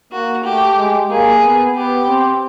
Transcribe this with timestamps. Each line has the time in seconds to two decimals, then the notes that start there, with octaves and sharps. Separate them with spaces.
0.12 A#3 F#4
0.44 A3 G4
0.77 G#3
1.10 A#3 G#4
1.42 B3
1.76 B3 G4
2.08 C4